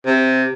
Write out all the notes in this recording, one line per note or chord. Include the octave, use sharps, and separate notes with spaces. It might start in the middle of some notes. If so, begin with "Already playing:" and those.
C3